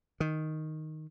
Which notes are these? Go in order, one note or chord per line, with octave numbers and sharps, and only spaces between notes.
D#3